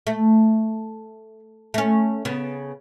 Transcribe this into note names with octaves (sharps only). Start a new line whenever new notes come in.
A3
A3 C#4
C#3 B3